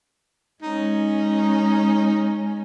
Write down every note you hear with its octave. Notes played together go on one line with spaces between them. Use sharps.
G#3 C#4 D#4